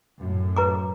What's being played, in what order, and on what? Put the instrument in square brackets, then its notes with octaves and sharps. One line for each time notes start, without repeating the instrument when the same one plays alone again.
[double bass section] F#2 A2
[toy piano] B4 A#5 D6